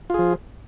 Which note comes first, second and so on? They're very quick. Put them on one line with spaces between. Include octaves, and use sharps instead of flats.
F4 G#4 F3